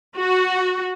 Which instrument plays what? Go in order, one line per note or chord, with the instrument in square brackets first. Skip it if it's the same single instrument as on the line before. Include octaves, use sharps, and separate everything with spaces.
[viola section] F#4